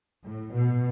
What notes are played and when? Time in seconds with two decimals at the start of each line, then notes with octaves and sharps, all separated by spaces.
0.25 A2
0.55 B2